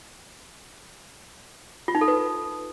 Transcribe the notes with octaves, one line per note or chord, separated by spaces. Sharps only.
F4
D#4
A4
B4